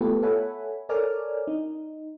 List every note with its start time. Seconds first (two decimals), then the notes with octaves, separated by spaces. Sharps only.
0.01 A3 B3 F4 G4 A4 B4
0.23 A4 C#5 E5 F#5 G#5 B5
0.89 A4 A#4 C#5 D5 G#5 F6
1.47 D#4